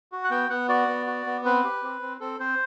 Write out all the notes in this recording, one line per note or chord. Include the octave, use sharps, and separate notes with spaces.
F#4
F#5
B3 G5
B3 F#5
F#4 D5
B3
F#4
B3
C4 B4
G4
C4
C4
C4 A4
C4 C5